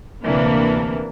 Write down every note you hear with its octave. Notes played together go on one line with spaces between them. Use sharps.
D2 C3 E3 A#3 D4